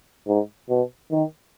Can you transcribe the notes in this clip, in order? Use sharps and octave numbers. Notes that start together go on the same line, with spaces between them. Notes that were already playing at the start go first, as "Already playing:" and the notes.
G#2
B2
D#3